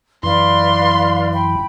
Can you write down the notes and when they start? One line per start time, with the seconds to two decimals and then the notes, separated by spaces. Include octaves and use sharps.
0.23 F#2 E3 B4 D5 F5 C6
1.33 G5 B5